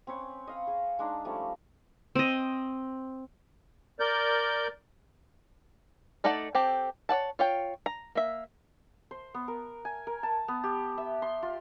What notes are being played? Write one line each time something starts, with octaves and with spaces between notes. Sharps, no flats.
C4 C#4 B4 C#5
D#5 F5 B5
G#4
G#3 D4 D#4
F3 G3 A3 C#4
C4 D#5
A#4 D5 G6
A3 D#4 A4 D5 F#5
C4 G4 A4
C#5 D5 F#5 A5
F4 C#5 G5
A#5
A#3 E5
C5
B3
A#4
G#5
A#4
A5
B3
G4
E5
C6
F4